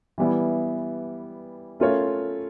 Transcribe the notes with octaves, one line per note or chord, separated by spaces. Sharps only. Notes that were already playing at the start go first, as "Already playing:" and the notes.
E3 G3 B3 E4
A3 C#4 F4 A#4 C#5